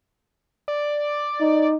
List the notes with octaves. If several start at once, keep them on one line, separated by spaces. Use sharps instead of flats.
D5
D#4